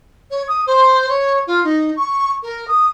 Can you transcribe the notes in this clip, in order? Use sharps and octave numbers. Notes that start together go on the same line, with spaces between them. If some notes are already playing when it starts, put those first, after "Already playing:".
C#5
D#6
C5
C#5
F4
D#4
C#6
A#4
D#6